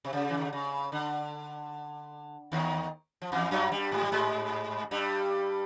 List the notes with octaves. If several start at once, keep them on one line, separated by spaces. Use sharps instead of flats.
C3
C#3
E3
D#3
D3
C#3
D3
D#2 D#3
F3
E2 E3
F#2 F#3
G2 G3
G#2 G#3
G3
G#2 G#3
G2 G3